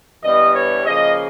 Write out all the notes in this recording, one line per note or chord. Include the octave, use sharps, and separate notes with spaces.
G2 E3 G3 B3 D#5
C#5
C#3 F3 A#3 D#5